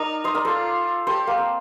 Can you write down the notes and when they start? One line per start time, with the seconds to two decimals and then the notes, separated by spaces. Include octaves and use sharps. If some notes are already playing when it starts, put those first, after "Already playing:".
Already playing: D#4 A#4 D5
0.24 C5 D#5
0.35 A#4 D5
0.45 F4 A4 C5
1.07 G4 A4 C5
1.27 A#3
1.38 C4